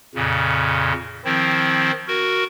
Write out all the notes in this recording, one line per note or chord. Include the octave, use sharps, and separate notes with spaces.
F2 A#2 C#3
D#3 F3 C4 E4
F#4 A#4